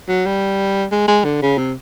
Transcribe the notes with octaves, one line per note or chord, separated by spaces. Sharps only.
F#3
G3
G#3
G#3
D3
C#3
C3